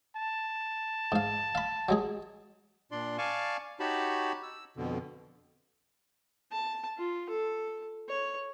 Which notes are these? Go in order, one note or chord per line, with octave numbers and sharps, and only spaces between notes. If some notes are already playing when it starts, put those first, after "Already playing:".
A5
G#2 F5
F5 B5
F#3 G#3 G#4
A#2 D4 D5 C6
D5 F5 G#5 A5 C#6
D#4 F#4 G4 C#5 A5 B5
E6
F2 B2 D3
A5
F4
A4
C#5